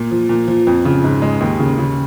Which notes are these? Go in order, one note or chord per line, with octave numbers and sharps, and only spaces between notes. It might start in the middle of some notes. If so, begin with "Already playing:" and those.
Already playing: A#2
F3
A#2
F3
F2
C#3
G#2
G#3
D#2
C#3
C#3